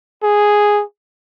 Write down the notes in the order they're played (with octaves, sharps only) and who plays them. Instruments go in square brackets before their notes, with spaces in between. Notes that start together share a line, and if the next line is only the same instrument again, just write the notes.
[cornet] G#4